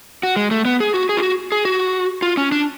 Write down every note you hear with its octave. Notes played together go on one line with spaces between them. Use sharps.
F#4
G#3
A3
B3
G#4
F#4
G#4
F4
F#4
G#4
F#4
F4
C#4
D4